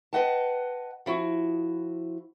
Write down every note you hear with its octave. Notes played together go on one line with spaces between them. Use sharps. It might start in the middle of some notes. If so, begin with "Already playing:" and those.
B4 C#5 D#5 F#5 G5 A5
F3 E4 F#4